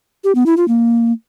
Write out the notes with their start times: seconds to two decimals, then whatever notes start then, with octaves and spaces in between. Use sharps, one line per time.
0.24 G4
0.35 B3
0.46 E4
0.57 F4
0.68 A#3